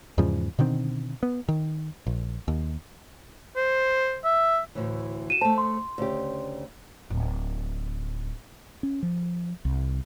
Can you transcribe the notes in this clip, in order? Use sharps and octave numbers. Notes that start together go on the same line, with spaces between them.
E2 G#2 C#3 F3
B2 D3 D#3 C4
B3
D#3
A#1
D#2
C5
E5
D2 A2 E3
F#4 D#7 E7
A3 C5 A5
C6
D2 C#3 G4
D1 A2
C#4
F3
C2